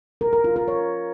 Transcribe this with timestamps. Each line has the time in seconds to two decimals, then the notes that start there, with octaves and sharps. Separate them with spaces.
0.21 A#4
0.33 A#4
0.44 F4
0.56 A#4
0.68 C#5